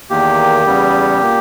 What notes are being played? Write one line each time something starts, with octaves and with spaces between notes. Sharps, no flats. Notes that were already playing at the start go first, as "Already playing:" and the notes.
E2 D#3 A#3 G4
E2 C#3 G3 B3
A#2 A#3